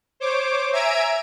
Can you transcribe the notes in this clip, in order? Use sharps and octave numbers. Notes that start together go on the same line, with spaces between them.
C5 C#5 D6
E5 G#5 A#5 E6 G#6 D7